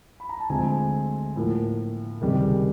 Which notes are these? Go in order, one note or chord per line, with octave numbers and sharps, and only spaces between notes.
B5
A#5
A5
D2 D3 F3 G#3 C4 G#5
A2 F3 A#3
C#2 C3 D#3 G3